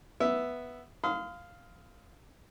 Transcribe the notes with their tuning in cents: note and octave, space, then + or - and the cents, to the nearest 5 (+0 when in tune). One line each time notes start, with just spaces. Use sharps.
B3 +0 E5 +0
F5 +0 C6 -40 D#6 +35